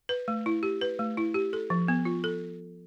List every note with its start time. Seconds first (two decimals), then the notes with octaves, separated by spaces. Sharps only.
0.09 B4
0.28 A3
0.46 E4
0.63 G4
0.81 B4
0.99 A3
1.17 E4
1.34 G4
1.53 A4
1.70 F3
1.88 B3
2.05 F4
2.24 A4